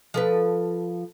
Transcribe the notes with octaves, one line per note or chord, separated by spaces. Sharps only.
F3 A4 B4